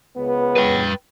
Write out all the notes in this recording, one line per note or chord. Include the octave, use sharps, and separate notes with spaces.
C#2 B3
B4 G5